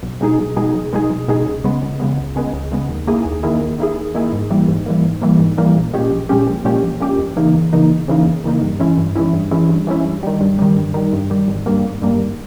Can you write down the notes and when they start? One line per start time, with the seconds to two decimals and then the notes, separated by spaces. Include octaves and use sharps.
0.03 B1
0.21 B2 G#3 D#4 G#4
0.39 B1
0.56 B2 G#3 D#4 G#4
0.74 B1
0.93 B2 G#3 D#4 G#4
1.10 B1
1.28 B2 G#3 D#4 G#4
1.46 C#2
1.64 C#3 G#3 B3
1.82 C#2
2.00 C#3 G#3 B3
2.18 C#2
2.36 C#3 G#3 B3
2.53 C#2
2.71 C#3 G#3 B3
2.89 D#2
3.07 D#3 A#3 E4 G#4
3.25 D#2
3.43 D#3 A#3 E4 G#4
3.61 D#2
3.78 D#3 A#3 E4 G#4
3.96 D#2
4.14 D#3 A#3 E4 G#4
4.33 G#2
4.50 E3 G3 A#3
4.68 G#2
4.86 E3 G3 A#3
5.04 G#2
5.22 E3 G3 A#3
5.39 G#2
5.58 E3 G3 A#3
5.75 A#1
5.93 A#2 G#3 C#4 G4
6.11 A#1
6.29 A#2 G#3 C#4 G4
6.47 A#1
6.65 A#2 G#3 C#4 G4
6.83 A#1
7.01 A#2 G#3 C#4 G4
7.19 E2
7.36 C#3 E3 A#3 D#4
7.54 E2
7.73 C#3 E3 A#3 D#4
7.90 E2
8.08 C#3 E3 A#3 D#4
8.26 E2
8.44 C#3 E3 A#3 D#4
8.62 G2
8.80 E3 G#3 C#4 E4
8.98 G2
9.15 E3 G#3 C#4 E4
9.33 G2
9.51 E3 G#3 C#4 E4
9.69 G2
9.87 E3 G#3 C#4 E4
10.05 G2
10.23 D#3 G3
10.40 G2
10.59 D#3 G3
10.76 G2
10.94 D#3 G3
11.13 G2
11.30 D#3 G3
11.48 G#1
11.66 G2 G3 A#3
11.84 G#1
12.02 G2 G3 A#3
12.20 G#1